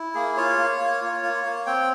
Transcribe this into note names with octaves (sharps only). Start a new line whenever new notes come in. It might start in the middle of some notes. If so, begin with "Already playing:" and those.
Already playing: E4
A#3 G#4
F4 C#5
A#3
A#3
F4
A#3
A#3
C4 G5